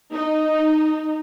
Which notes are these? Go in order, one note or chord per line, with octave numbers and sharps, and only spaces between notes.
D#4